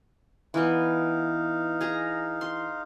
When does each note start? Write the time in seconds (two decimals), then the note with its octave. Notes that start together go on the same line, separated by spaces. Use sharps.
0.54 E3 B3 D#4 F5
1.81 G#4 A#5
2.41 C6